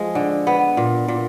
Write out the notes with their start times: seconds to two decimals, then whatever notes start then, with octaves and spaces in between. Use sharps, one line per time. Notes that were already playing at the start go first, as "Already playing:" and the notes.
Already playing: F3 G#3
0.15 D3
0.47 B3
0.77 A#2
1.08 A#2